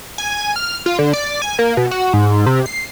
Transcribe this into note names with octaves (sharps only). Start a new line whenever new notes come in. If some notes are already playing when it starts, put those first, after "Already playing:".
G#5
F6
F4
D3
D5
G#5
A#3
B2
F#4
G#2
C3
C7